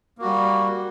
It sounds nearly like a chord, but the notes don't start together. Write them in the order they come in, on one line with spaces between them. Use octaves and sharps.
A#3 F#4 G3